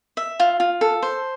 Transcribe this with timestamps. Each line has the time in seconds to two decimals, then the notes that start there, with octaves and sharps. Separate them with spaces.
0.17 E5
0.40 F4
0.60 F4
0.81 A4
1.03 C5